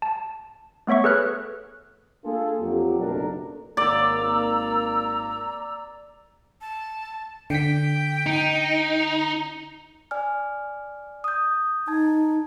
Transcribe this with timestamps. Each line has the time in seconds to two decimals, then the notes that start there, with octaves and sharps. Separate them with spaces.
0.02 A5
0.87 A3 B3 C#5 E5 C#6
1.04 G#4 A4 B4 C#5 F6 F#6
2.25 A#3 D4 F4 G#4 A4
2.60 F2 F#3 A#3 G4
3.00 F#1 B1 A3 D4 A#4
3.77 G#1 A#3 D5 A#5 E6
6.61 A5
7.50 D3 G5 B6
8.26 D#4
10.11 D5 G#5 F6
11.24 D#6 G6
11.88 D#4 A5 G#6